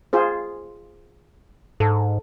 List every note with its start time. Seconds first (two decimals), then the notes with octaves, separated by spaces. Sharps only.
0.13 F4 G#4 C5
1.80 G#2 A4